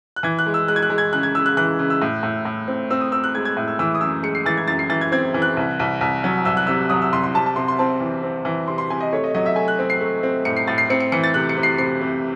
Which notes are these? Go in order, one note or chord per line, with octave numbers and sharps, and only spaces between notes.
F#6
E3 G#6
F#6
G#3
E6
G#3 F#6
G#6
F#6
G#3
G#6
C#3 F#6
G#6
C#3 E6
F#6
E3 F#6
C#3
E6
A2
A2
A2
C4
C4 E6
D#6
C4 E6
F#6
G#3 G#6
G#6
A2
E6
E3 E6
D#6
F#2 E6
G#3 C#7
C7
E3 A6
G#6
F#2 A6
C7
E3 A6
G#6
C4 G#6
E3
F#6
C2
C2
C2
F#3
C2 E6
F#6
C3 E6
F#3 D#6
E6
C2 C6
C6
C3 A5
A5
C3 C6
C6
C4 A5
E3
C4
E3
C3 C6
C6
C3 G#5
D#5
A3 C#5
D#5
F#3 D#5
E5
A3 G#5
F#6
C4
C7
A3
C4
A2 C#7
C7
A2 A6
C7
C4 C#7
C#7
E3 C#7
A6
C3 F#6
C#7
C3
C7
C3 C7
C3